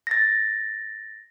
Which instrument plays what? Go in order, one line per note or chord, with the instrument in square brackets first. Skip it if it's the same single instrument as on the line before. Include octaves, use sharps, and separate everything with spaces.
[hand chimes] A6 A#6